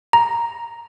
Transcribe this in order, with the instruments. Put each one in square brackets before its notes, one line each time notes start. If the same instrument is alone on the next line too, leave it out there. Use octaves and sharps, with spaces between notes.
[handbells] A#5